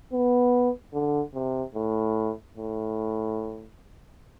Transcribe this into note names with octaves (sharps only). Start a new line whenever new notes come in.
B3
D3
C3
A2
A2